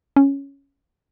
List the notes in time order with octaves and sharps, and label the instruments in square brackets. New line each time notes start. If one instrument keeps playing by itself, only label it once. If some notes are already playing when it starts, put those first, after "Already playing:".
[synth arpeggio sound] C#4